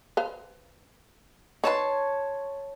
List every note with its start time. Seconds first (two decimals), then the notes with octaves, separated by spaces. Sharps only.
0.17 B4 C5 F5
1.64 D#4 B4 C#5 A5 C6